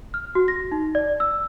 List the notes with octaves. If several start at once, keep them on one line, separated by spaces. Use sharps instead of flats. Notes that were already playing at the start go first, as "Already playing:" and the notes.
F6
F#4
A#6
D#4
D5
E6